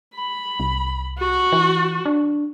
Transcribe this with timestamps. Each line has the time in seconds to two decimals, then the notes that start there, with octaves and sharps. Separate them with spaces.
0.16 B5
0.60 C2
1.18 F#4
1.52 E3
2.05 D4